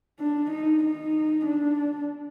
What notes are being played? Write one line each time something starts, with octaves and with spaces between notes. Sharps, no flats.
D4
D#4
D#4
D4